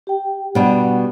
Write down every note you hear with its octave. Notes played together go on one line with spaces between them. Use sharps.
G4 G5
B2 G3 D4 F#5